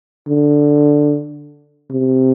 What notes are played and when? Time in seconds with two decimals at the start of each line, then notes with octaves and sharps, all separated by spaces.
0.28 D3
1.91 C3